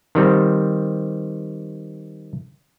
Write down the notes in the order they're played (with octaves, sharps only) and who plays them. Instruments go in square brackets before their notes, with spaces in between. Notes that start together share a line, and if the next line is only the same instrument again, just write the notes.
[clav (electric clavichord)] D#3 G3 C4